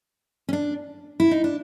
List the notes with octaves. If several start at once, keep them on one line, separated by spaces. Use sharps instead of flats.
C#4
D4
E4
D#4
D4